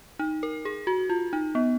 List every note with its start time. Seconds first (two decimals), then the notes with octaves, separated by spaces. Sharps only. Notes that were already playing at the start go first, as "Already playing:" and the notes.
0.19 D#4
0.43 A#4
0.65 G#4
0.87 F#4
1.09 F4
1.33 D#4
1.55 B3